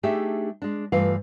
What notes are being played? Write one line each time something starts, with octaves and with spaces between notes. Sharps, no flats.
A3 D4 D#4 G4 G#4 E5
G#3 D4
G2 E3 A3 F4 F5